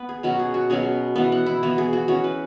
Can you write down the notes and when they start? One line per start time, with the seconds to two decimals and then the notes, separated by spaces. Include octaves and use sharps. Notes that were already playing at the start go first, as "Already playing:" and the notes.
Already playing: B3 B4
0.09 G#4
0.23 B2 F#3 C#4 F#4
0.39 G#4
0.54 F#4
0.70 B2 F#3 C#4 G#4
1.16 E3 B3
1.32 F#5
1.46 E4
1.63 E3 B3 F#4
1.78 G#4
1.93 F#4
2.08 E3 C#4 F#4
2.24 B4